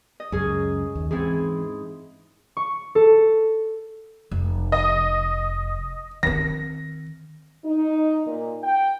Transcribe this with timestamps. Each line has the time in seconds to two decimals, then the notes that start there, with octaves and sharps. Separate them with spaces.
0.20 D#5
0.32 C#2 F#2 C#4 G#4
0.95 D#2
1.11 G#2 E3 C4 E4 G#4
2.57 C#6
2.95 A4
4.31 F1
4.72 D#5
6.23 D#3 C4 A#6
7.65 D#4
8.26 A#2
8.62 G5